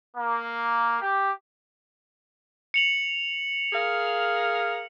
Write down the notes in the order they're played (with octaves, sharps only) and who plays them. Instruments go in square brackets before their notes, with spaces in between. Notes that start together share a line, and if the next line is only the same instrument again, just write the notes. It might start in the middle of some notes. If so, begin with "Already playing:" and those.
[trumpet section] A#3
G4
[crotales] C#7 F7 F#7
[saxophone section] G#4 A#4 F5